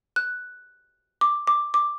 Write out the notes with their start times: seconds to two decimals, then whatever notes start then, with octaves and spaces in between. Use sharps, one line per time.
0.16 F#6
1.21 D6
1.47 D6
1.74 D6